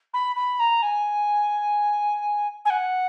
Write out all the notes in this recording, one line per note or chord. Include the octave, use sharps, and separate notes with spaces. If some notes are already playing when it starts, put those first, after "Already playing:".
B5
B5
A#5
G#5
G#5
F#5